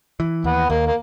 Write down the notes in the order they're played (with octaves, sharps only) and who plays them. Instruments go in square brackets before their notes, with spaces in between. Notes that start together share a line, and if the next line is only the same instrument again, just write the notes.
[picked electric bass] E3
[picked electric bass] D#2 [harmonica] B3
[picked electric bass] D#2 [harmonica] A#3
[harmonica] A#3